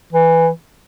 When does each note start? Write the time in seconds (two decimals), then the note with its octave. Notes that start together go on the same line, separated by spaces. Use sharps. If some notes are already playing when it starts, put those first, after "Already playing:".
0.13 E3